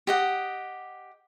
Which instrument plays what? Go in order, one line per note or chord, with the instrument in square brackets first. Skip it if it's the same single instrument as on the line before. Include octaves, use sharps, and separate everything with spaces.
[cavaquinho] G4 D#5 F#5